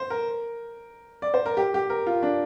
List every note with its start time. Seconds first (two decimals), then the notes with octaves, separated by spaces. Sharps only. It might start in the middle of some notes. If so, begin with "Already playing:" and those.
Already playing: C5
0.10 A#4
1.22 D5
1.34 C5
1.46 A#4
1.57 G4
1.74 G4
1.90 A#4
2.06 F4
2.23 D4